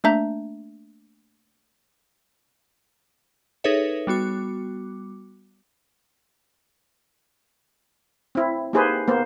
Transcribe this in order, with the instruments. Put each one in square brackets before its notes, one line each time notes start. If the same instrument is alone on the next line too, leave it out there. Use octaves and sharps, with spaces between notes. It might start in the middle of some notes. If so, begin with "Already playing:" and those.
[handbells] A3 A#3 D4 E5 A#5 G6
[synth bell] D#4 G#4 A4 B4 C#5 E5
G3 B3 F#4 D6
[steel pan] C4 E4
A#3 D#4 G4 G#4 B4 C5
A#3 B3 C5